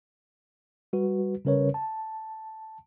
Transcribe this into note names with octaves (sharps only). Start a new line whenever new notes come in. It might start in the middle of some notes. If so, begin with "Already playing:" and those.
G3 F#4 B4
C#3 G3 C#4 A#4 B4 C#5
A5